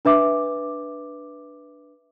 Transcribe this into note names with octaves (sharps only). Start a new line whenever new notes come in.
D4 B4 E5 D6